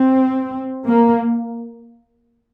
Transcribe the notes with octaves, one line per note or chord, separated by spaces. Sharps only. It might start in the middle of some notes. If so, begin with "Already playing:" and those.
Already playing: C4
A#3